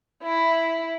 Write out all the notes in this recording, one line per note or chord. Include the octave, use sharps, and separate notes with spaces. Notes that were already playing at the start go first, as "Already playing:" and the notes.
E4